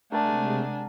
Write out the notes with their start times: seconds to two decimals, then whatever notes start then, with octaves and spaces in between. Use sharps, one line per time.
0.12 C3 G#3 A3 D4 A#4 F#5 G#5 A5